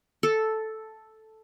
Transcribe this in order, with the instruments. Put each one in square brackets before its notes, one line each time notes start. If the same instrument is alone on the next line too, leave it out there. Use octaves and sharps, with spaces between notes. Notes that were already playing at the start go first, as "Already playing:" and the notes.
[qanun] A4